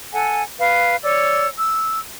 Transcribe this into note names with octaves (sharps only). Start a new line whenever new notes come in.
A4 F#5 G#5
B4 F5
C#5 D5 E6
E6